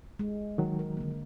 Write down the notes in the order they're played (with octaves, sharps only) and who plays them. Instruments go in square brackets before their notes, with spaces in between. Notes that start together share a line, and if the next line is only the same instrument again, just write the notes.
[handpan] G#3
[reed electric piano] D#3 F#3
[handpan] A#4
D3 A#3